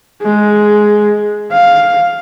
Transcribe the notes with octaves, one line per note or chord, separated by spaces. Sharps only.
G#3
F5